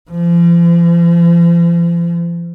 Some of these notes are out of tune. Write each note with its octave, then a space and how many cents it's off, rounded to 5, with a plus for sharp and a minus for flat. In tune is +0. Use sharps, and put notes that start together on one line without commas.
F3 -40